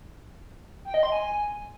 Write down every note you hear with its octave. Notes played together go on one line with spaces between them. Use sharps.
G5
D#5
C6
G#5